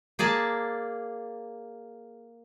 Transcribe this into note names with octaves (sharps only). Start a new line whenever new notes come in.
A#3 G#4 D5 A5